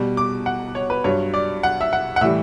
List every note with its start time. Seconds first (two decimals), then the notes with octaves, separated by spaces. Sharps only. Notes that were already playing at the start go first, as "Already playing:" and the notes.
Already playing: B2 G3
0.17 D6
0.46 F#5
0.75 C#5
0.90 B4
1.04 G2 F#3 C#5
1.34 D5
1.63 F#5
1.81 E5
1.93 F#5
2.16 F#5
2.21 A2 E3 G3 E5